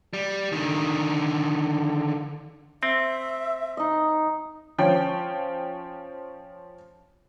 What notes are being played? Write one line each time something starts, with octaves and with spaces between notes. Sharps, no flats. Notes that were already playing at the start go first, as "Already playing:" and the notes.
G3
D3 D#3
C4 E5
D#4 D#5
F3 C#4 C#5 G5